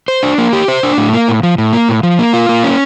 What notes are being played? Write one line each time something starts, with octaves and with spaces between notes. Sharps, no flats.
C5
D4
A#3
G4
C5
D4
A2
A#3
A2
F3
A2
A#3
A2
F3
A#3
F4
A#3
C#4